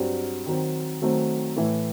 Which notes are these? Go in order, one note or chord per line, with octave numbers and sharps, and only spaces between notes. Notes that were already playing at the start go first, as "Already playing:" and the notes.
Already playing: G2 F#3 C4
D#3 F#3 C4
D#3 F#3 A3 C4
A2 E3 A3 E4